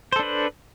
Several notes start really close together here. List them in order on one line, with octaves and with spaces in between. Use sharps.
C5 A4 D4 B4